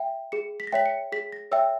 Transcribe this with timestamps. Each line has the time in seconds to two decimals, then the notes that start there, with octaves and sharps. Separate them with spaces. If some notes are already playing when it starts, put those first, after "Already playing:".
Already playing: E5 G5
0.32 G#4 C#7
0.60 B6
0.67 A#6
0.72 C#5 E5 G5 B6
0.86 C#7
1.12 G#4 B6
1.32 A#6
1.51 C#5 E5 G5 E6